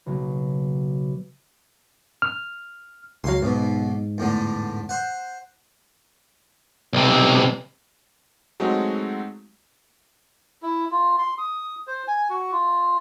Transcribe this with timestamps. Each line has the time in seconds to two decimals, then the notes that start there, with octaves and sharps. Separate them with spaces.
0.06 B1 C#3 F#3 A#3
2.22 F6
3.24 C#2 F#3 F5 C6
3.42 B1 G#2 B2
4.18 E2 A2 D3
4.89 C5 F#5
6.93 B1 C3
8.60 F#3 G#3 A3 C4 D#4 F#4
10.63 E4
10.91 F4
11.19 C6
11.38 D#6
11.87 C5
12.08 G#5
12.30 F#4
12.52 F4